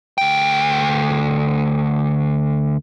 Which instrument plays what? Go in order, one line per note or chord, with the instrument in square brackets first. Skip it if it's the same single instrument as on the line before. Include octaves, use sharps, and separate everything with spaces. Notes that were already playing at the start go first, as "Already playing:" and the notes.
[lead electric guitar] D2 G5